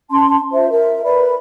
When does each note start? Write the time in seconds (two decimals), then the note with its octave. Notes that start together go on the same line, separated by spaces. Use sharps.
0.11 C#4 A5 C6
0.52 F4 C5 E5
0.70 A#4 E5
1.04 A#4 B4 D5 B5